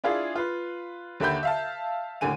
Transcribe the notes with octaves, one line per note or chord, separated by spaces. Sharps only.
D4 E4 F4 G#4 F5
F4 B4
D#2 D3 E5 B5 G6
E5 F5 A5
D#2 A2 D3 G#5 D#7